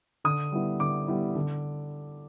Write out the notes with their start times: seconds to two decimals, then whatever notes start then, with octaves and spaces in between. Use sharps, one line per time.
0.24 D3 D#6
0.52 G3 B3 E4
0.80 D3 D6
1.08 G3 B3 E4
1.35 D3